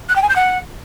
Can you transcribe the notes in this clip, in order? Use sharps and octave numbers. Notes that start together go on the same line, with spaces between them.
F#6
G5
G#5
G6
F#5